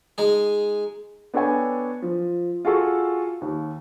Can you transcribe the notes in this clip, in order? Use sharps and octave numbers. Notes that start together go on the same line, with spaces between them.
G#3 D#4 G#4
B3 D4 A4 C#5 G5 G#5
F3
F4 F#4 G#4 A4 C#6
D#2